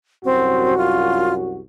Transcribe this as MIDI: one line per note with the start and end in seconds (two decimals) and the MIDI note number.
0.25 1.61 36
0.25 1.61 42
0.25 0.77 60
0.25 1.61 66
0.78 1.34 65